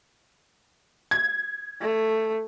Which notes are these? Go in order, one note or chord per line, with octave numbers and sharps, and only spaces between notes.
G#6
A3